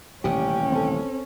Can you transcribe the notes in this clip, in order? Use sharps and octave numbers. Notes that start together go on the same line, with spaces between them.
D#1 A1 C3 C#4 G4 G5
C4 A4